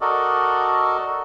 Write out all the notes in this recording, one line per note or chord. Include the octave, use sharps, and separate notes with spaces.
F#4 A4 A#4 D5 D#5